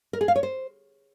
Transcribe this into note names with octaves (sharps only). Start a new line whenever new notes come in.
A#4
G#4
F5
C#5
C5